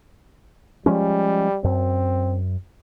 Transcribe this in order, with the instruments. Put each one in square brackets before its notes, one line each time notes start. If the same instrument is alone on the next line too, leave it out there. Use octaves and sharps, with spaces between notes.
[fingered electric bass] F3 G#3 C#4 [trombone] G3
[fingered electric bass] F#2 [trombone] C4